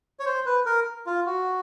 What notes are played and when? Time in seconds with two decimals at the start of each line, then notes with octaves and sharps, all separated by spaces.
0.19 C#5
0.26 C5
0.46 B4
0.66 A#4
1.06 F4
1.26 F#4